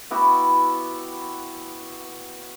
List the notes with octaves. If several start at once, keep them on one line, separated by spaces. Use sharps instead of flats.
B3 E4 F#4 G4